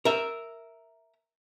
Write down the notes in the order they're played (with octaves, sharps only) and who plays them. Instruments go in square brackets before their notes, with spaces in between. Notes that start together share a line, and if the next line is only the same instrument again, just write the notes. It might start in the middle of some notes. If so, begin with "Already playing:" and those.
[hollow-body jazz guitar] A#4 E5